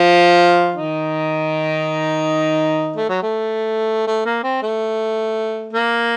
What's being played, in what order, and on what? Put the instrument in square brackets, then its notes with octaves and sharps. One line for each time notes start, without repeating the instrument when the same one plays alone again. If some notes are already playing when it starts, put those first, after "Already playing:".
Already playing: [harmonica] F3 F4
D#3 D#4
A3
F#3
A3
A3
A#3
C4
A3
A#3